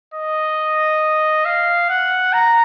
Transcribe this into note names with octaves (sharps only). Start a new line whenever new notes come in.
D#5
F5
F#5
A#5